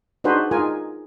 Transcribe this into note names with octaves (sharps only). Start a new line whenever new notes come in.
D4 D#4 F#4 G#4 B4 C5
D#4 F4 G#4 A#4 G#5